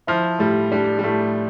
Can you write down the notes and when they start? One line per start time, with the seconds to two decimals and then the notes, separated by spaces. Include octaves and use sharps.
0.07 F3 E4
0.39 A2 G3
0.71 G3 D4
0.98 G3
1.04 A2 A3